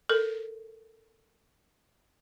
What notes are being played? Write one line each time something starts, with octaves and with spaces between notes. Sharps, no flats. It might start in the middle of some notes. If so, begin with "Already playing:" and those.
A4 A#4